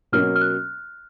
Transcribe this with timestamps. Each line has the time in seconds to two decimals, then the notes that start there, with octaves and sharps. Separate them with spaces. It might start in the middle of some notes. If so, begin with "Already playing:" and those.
0.12 B2 F#3 A#3 C#4 F6
0.36 F6
0.41 F#6